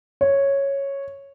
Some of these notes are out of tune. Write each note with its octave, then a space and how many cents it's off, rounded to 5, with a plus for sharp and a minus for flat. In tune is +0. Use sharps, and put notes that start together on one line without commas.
C#5 -5